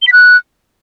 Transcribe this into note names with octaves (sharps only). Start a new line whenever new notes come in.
G7
B6
F#6